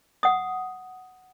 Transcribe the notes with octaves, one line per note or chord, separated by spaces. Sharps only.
F#5 D#6